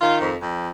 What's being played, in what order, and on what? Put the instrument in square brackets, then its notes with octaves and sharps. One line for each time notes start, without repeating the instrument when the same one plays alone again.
[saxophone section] D#3 F4
F2
F2